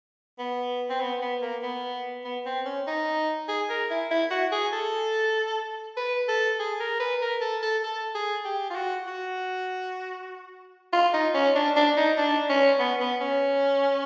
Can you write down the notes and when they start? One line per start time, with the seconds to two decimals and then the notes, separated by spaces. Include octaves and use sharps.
0.39 B3
0.90 C4
1.00 B3
1.22 B3
1.42 A#3
1.63 B3
2.25 B3
2.46 C4
2.66 C#4
2.87 D#4
3.49 G#4
3.69 A#4
3.91 E4
4.11 E4
4.31 F#4
4.52 G#4
4.73 A4
5.97 B4
6.28 A4
6.59 G#4
6.80 A#4
7.00 B4
7.21 A#4
7.41 A4
7.63 A4
7.84 A4
8.15 G#4
8.45 G4
8.70 F4
8.76 F#4
9.07 F#4
10.93 F4
11.14 D#4
11.34 C#4
11.55 D4
11.76 D4
11.97 D#4
12.18 D4
12.49 C#4
12.79 B3
13.00 B3
13.20 C#4